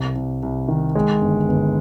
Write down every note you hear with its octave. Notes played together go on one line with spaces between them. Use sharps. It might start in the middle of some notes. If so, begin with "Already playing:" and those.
Already playing: C2
C2
C2
D#3
G#3
G1
G1